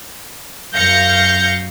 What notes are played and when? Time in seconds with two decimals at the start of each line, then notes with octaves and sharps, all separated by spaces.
0.72 F#2 F5 G6 A#6 C#7